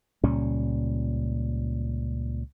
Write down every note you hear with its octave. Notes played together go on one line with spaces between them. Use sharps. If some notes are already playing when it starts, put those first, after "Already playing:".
C#2 A#2 G3 C#4